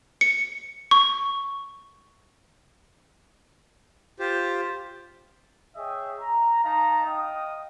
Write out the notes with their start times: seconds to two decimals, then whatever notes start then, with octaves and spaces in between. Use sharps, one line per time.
0.21 C#7
0.91 C#6
4.19 F4 G4 C5
5.76 G#4 C#5 D#5 E5 G5
6.18 A#5
6.63 D#4 D#5 F5 A5 A#5
7.06 D#5 F5 G5 D#6